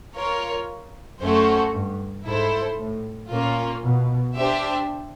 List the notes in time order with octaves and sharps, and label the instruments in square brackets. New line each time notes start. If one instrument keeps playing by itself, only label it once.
[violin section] F4 A#4 C#5
[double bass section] F#2 [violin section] A3 C#4 F#4 A4 C5
[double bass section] G2
[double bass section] G#2 [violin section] E4 A4 C5
[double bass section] A2
[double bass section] A#2 [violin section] A#3 C#4 F4
[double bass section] B2
[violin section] D4 G4 C5 E5